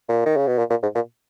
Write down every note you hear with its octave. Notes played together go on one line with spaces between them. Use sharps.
A#2
D#3
C#3
B2
A#2
A#2
G#2
A#2